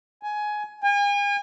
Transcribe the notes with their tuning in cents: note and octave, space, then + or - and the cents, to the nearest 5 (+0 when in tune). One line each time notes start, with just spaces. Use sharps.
G#5 +15
G#5 -40